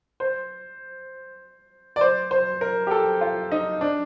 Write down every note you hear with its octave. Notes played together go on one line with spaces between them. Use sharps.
C5
D5
C5
C5
A#4
G4
A4
F4
D#4
D4